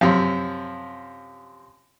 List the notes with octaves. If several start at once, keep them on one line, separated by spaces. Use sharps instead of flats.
F#2 C3 F3